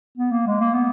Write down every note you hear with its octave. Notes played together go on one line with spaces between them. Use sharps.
B3
A#3
G#3
A#3
B3